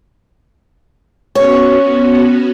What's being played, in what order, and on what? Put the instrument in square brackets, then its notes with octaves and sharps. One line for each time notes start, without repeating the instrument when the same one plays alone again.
[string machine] B3 C#4 F#4 [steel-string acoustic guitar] C#5